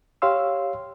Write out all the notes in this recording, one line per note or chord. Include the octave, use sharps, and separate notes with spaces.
G4 C#5 F5 C6 E6